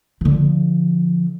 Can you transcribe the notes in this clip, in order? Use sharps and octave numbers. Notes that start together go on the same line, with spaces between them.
D3 F3